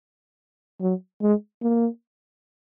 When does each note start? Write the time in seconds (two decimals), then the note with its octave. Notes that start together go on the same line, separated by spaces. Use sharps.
0.81 F#3
1.21 G#3
1.62 A#3